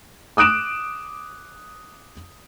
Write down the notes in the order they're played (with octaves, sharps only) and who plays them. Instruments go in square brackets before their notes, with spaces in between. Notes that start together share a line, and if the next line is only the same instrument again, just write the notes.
[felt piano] D6 D#6 F#6 D7 E7